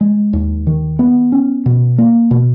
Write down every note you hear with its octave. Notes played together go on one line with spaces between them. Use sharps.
G#3
D#2
D#3
B3
C#4
B2
A#3
B2